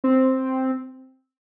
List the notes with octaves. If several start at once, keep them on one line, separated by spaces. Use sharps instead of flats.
C4